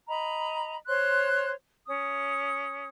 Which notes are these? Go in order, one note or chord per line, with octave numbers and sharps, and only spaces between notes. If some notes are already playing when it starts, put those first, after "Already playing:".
D#5 A#5 B5
C5 C#5 C6 F#6
C#4 D#6